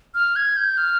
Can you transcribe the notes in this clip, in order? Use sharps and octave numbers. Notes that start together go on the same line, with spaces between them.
F6
G#6
G6
F6